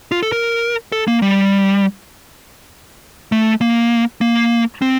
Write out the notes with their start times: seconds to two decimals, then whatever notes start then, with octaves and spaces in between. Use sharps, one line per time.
0.12 F4
0.23 A4
0.32 A#4
0.92 A4
1.07 A#3
1.22 G3
3.32 A3
3.61 A#3
4.21 A#3
4.82 C4